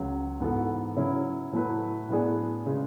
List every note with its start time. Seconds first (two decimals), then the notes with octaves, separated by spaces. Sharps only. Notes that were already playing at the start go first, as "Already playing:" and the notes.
Already playing: C#2 C#3 F#3
0.40 G#2 E3 B3 F#4 A4
0.96 C#3 F#3 C#4 E4
1.52 A2 F#3 A3 E4 B4
2.09 A2 F#3 B3 D4 G#4
2.66 C#3 G#3